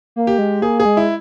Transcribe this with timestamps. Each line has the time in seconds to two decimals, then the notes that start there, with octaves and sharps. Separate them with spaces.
0.16 A#3
0.27 G4
0.38 G#3
0.62 A#3 G#4
0.80 G#4
0.85 G#3
0.97 E4